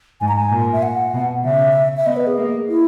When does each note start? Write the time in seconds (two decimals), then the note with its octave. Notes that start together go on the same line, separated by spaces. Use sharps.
0.21 G#2 G#5
0.28 A#5
0.36 G#5
0.51 A#2
0.73 E5
0.83 F#5
1.13 B2
1.44 C#3 E5
1.97 E5
2.06 B3 D#5
2.16 B4
2.27 G#4
2.37 A#3
2.69 E4